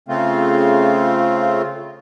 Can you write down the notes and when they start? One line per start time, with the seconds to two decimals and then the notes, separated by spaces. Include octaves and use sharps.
0.08 C#3 A3 C4 F4